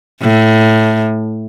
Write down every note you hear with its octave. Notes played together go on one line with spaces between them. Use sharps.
A2